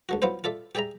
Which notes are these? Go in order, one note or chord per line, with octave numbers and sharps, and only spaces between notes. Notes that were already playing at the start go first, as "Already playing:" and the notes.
C#2 D3 F#4
F#3 B3 E4 F4 C5
F4 A4 D5 E5
G4 G#4 D5 E5 A#5